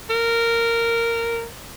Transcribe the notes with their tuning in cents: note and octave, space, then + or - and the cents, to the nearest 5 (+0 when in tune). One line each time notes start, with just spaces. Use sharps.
A#4 -10